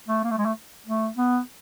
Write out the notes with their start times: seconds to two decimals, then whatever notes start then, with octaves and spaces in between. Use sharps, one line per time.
0.08 A3
0.24 A#3
0.31 A3
0.38 G#3
0.46 A3
0.86 A3
1.17 B3